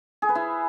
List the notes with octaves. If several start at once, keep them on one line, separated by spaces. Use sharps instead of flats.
G#4
B4
E4